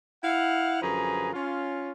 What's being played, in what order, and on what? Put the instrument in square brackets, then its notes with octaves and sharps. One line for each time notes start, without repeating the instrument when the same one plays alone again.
[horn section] E4 F5 F#5
F#2 D3 F3 G#4 B4 A#5
C#4 F4